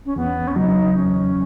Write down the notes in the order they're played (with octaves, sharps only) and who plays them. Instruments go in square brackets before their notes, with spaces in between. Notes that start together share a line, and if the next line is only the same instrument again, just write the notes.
[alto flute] C#4
[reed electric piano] E2 [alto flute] B3
[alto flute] C#4
[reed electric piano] C#3 F#3 [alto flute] D#4
[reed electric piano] E2 [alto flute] C#4